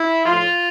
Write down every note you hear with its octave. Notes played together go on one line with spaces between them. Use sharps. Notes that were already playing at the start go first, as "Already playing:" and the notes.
Already playing: E4
A2 F3 F4